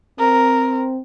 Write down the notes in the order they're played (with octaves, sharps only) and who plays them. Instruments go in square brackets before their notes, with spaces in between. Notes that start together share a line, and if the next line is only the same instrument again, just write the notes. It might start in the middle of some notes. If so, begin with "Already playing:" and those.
[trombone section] C4 [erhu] A#4